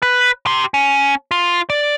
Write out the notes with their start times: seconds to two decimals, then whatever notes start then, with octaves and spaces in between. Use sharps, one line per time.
0.02 B4
0.46 G4 C6
0.74 C#4
1.31 F4
1.70 D5